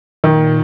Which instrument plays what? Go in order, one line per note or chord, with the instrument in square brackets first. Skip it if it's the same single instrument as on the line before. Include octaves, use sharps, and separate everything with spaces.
[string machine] A#2 [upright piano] D#3